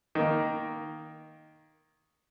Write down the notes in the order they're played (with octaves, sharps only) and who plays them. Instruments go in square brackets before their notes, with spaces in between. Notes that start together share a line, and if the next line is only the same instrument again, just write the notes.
[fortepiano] D#3 A#3